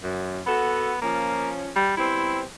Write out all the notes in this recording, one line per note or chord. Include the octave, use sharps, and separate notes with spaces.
F#2
B3 F#4 A4
F3 A#3 C#4
G3
G3 B3 C4 E4